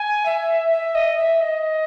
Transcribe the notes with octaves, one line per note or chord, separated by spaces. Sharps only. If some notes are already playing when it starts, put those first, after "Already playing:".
Already playing: G#5
E5
E5
D#5
E5
D#5